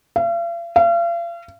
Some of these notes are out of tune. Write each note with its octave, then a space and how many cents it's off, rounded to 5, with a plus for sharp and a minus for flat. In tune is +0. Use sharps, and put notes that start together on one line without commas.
F5 -45
F5 -40